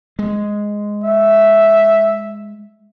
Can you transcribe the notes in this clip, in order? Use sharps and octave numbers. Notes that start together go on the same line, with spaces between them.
G#3
E5